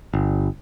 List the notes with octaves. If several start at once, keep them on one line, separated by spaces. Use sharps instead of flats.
G1